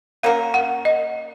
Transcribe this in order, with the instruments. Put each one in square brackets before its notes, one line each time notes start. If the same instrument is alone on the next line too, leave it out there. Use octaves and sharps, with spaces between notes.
[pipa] A#3 C#4 F#4 A#4 [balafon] F5
[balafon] F#5
D#5